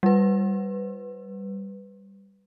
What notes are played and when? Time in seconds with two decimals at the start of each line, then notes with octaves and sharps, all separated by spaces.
0.03 G3 B4